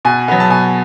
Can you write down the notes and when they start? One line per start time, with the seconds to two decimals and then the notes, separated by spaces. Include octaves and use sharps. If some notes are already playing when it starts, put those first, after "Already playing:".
0.05 B2 G#5
0.28 F#3 B3
0.40 A5
0.50 B2 G#5